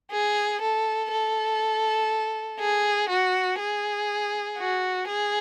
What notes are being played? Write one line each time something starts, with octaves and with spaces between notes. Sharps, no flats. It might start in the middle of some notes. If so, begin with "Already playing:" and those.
G#4
A4
A4
G#4
F#4
G#4
F#4
G#4